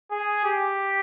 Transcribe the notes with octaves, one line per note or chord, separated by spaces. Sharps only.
G#4
G4